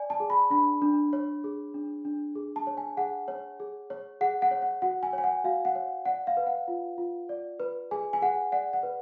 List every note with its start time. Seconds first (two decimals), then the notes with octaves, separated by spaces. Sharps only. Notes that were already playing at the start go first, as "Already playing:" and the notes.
Already playing: D5 G#5
0.10 A5
0.20 G#4
0.30 B5
0.50 D4 B5
0.82 D4
1.13 C#5
1.44 G#4
1.74 D4
2.05 D4
2.35 G#4
2.56 A5
2.67 C#5
2.77 G#5
2.97 G#4 F#5
3.28 C#5
3.60 G#4
3.90 C#5
4.21 G#4 F#5
4.42 F#5
4.51 C#5
4.62 F#5
4.82 F#4 F#5
5.03 G#5
5.13 C#5 G#5
5.24 F#5
5.44 F#4 F5
5.65 F#5
5.75 C#5
6.05 D5 F#5
6.27 F5
6.37 B4
6.47 F#5
6.68 F4
6.98 F4
7.29 D5
7.60 B4
7.91 G#4 G#5
8.13 G#5
8.22 G#4 F#5
8.52 D5 F#5
8.73 F#5
8.83 B4